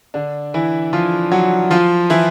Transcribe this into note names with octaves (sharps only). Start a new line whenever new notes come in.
D3 D4
E3 E4
F3 F4
F#3 F#4
F3 F4
E3 E4